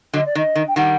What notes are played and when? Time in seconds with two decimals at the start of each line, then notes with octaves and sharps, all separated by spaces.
0.13 D3 F#3 D#5
0.26 D5
0.35 D#3 D#5
0.55 D#3
0.68 G5
0.76 D#3 G3 F#5